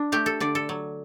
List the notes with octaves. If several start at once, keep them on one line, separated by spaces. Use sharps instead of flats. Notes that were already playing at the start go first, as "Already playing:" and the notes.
Already playing: D4
A3 G4
A4
D3 D5
A4
F#3